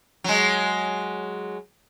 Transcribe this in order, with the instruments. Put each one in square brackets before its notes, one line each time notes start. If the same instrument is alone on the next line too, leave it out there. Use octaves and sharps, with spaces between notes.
[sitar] F#3 G#3